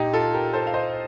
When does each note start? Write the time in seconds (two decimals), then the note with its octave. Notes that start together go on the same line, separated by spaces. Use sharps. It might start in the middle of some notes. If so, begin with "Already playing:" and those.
Already playing: A#2 D#4 G4
0.13 F4 A4
0.34 G4 A#4
0.53 A4 C5
0.67 F5
0.74 C5 D#5